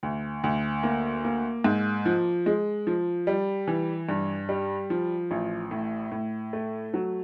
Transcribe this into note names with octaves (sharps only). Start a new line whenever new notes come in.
D2
D2
A#3
A#3
G#2
F3
G#3
F3
G3
E3
G2
G3
F3
A1
A2
A2
A3
F#3